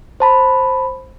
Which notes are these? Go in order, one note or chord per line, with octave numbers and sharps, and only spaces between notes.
C5 A5 B5